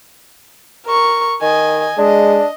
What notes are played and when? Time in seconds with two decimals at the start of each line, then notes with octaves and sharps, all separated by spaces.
0.86 A#4 C#6
1.42 D#3 D#5 G#5
1.98 G#3 D4 D#5